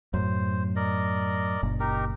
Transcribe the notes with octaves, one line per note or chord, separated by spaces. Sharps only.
F#2 A2 C5
A#4 D5 D#5
F#1 A#2
D#4 G4 A#4